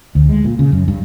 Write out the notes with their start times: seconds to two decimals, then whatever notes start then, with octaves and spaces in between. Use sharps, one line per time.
0.15 D2
0.29 G#3
0.44 A#2
0.59 C#3
0.72 F#2
0.88 G2